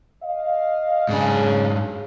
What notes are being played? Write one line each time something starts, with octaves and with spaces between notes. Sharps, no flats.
D#5 F5
G#2 C#3 D4